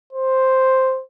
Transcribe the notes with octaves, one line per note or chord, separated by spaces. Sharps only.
C5